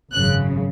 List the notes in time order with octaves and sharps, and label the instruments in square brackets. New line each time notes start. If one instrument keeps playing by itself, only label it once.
[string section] G#1 F#2 C#3 F#6